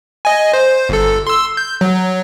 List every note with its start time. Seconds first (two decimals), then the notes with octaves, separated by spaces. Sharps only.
0.25 D#5 G#5
0.53 C5
0.89 G1 A4
1.27 C6 E6
1.57 G6
1.81 F#3